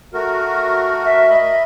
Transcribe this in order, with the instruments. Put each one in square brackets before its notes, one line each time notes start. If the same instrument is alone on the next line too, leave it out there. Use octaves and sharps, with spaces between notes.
[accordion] A3 F#4 A#4
[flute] E5
[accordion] D#5 B5 [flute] E5